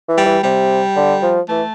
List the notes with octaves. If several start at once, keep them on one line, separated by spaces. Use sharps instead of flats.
E3
G3
E3
C3 G3
D3
F3
E3 A3